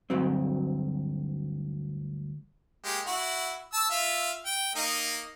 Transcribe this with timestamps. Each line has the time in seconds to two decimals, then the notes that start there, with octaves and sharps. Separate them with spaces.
0.10 D2 G2 F#3 C4
2.84 G#3 A#3 G4
3.06 E4 F#4
3.73 A5 E6
3.90 F4 E5 F5
4.46 G5
4.75 A#3 D#4 D#5